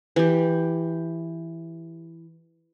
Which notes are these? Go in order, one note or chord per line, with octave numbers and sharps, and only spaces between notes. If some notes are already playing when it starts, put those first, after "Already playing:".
E3 G4